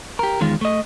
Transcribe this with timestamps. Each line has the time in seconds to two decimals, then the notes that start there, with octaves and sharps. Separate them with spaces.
0.19 G4 A#4
0.41 E2 D#3 G#3 F4
0.61 A3 D#5